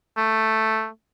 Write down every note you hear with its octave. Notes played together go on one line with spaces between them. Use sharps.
A3